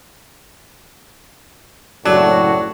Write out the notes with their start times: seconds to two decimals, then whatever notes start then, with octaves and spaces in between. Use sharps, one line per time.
2.06 F#1 A2 F#3 D4 F#4